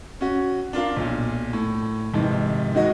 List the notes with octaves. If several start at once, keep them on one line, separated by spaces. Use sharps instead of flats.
C#4 F#4
D4 F4 A#4 F5
B1 A#2
A2
F2 G#2 C3 D#3 E3
D#3 G#3 F#4 D#5